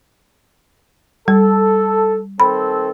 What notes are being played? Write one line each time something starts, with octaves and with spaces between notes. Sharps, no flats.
G3 A4
D#3 C4 A4 B5